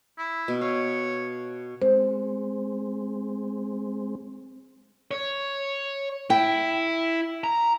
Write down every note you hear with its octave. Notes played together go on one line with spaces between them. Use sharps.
E4
B2
C#5 F5
G#3 C4 C5
C#5
E4 G5
A#5